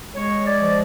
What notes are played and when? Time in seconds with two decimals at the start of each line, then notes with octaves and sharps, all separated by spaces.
0.14 G#3 C#5
0.45 D5
0.59 F3